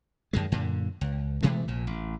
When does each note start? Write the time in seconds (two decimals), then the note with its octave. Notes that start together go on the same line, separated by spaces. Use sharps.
0.33 F#2 D#3 G#3
0.52 F#2 A#2 D3
1.01 C#2
1.43 B2 E3 G#3 A3
1.68 A#1 A#2
1.87 A1